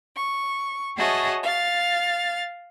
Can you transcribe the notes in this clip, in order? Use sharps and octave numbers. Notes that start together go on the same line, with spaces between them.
C#6
F#4 G#4 C#5 D#5 E5 A5
F5 A6